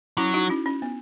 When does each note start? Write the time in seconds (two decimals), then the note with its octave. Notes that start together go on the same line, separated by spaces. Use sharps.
0.18 F#3 C#4 E4
0.34 D#4 F#4
0.49 C#4 E4
0.66 C#4
0.82 B3